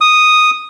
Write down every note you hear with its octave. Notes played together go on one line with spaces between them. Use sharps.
D#6